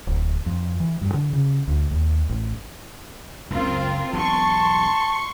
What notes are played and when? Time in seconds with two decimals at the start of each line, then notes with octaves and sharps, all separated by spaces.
0.07 D1
0.46 F2
0.80 E3
1.01 G2
1.14 D3
1.33 C#3
1.68 D2
1.91 D#2
2.29 A1
3.50 F#1 C#2 C4 F4 A#4
4.13 E1 B1 B2 A5 C6 C#6